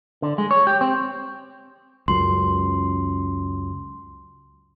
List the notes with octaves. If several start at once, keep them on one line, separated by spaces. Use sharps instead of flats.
D3
G#3
C#5
G4
C4
C#2 F#2 C6